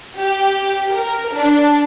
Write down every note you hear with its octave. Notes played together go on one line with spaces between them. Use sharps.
G4
A#4
D4